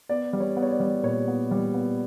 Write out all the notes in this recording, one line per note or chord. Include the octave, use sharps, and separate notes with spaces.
B3 D5
G3
C#5
B3
C#5
D5
G3
A#2 C#5
B3
G3
B3